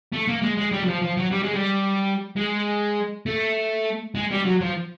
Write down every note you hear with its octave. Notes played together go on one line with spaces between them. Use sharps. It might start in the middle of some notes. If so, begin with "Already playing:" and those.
A3
A#3
G#3
G#3
G3
F#3
F3
F3
F#3
G3
G#3
G3
G#3
A3
G#3
G3
F#3
F3